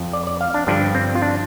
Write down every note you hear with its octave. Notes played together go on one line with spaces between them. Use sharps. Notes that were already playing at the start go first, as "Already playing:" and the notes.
Already playing: F2 F3
D5
D5
F5
D4
G2 D3 F3 D4
C4
F4
D4